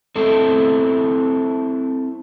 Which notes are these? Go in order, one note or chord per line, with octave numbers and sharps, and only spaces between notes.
A3 C4 E4 A4